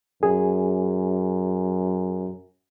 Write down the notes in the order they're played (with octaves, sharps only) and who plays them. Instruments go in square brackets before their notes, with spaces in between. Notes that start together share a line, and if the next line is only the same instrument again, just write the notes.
[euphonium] F#2 [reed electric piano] G#4